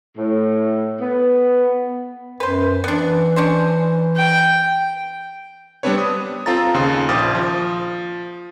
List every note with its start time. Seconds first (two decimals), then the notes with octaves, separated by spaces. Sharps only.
0.17 A2
1.01 B3
2.40 F#2 B4 C5
2.84 E3 B3 D4
3.36 C#4 D4 C5
4.17 G5
5.83 G3 B3 C4 D4 B4 C#5
5.98 D#6
6.46 C4 F4 A4 A#5 A6
6.74 D#2 C#3 C6
7.09 A#1 C5 D6 D#6 F6 A6
7.35 F3